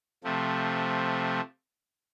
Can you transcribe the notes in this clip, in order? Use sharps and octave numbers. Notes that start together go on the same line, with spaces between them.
C3 F3 A3